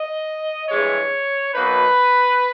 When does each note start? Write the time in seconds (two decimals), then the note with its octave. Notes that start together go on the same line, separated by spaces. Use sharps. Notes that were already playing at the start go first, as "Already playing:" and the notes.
Already playing: D#5
0.69 G2 E3 G#3 C#5
1.54 B2 F#3 A#3 D#4 B4